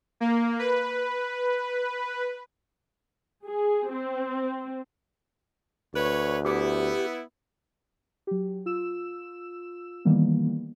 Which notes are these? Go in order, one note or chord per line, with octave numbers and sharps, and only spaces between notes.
A#3
B4
G#4
C4
D2 B4 C#5
B3 E4 G4
F#3 G4
F4 E6 E7
D#3 E3 G3 A#3 B3